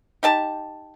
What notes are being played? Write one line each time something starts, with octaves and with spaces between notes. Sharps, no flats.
D#4 G4 A5